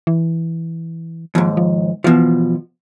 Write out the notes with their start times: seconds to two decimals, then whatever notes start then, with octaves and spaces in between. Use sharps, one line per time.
0.07 E3
1.35 D#2 G#2 F3
1.57 F3
2.04 B2 E3 F3